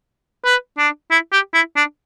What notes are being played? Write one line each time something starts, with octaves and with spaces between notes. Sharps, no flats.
B4
D4
E4
G4
E4
D4